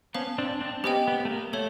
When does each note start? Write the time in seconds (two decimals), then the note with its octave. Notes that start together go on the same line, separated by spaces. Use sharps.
0.14 B3 C#4 C5 F5 A5
0.38 C4 D4
0.60 C4 D4
0.84 B3 C#4 G4 C5 D#5 G5
1.08 B3
1.25 A3
1.30 A#3
1.53 A3 A4 C#5 E5